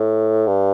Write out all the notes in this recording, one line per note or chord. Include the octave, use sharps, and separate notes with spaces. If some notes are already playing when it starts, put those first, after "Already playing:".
Already playing: A2
G2